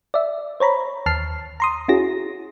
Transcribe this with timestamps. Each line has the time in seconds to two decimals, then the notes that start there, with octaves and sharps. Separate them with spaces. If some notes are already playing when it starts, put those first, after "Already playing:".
0.14 D5 E5
0.60 C5 C#5 A#5 B5
1.06 D#2 A5 F6 C7
1.60 A#5 C6 D#6
1.88 C#4 E4 F#4 G#4 A#6